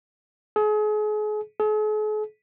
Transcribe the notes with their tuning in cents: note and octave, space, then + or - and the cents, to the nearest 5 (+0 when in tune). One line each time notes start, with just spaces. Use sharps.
G#4 +35
G#4 +45